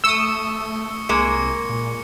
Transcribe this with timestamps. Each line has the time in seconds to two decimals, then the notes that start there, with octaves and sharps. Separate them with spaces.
0.04 A3 C#6 D#6 E6 C#7 G7
1.09 C2 G#3 A#3 C#7
1.69 A#2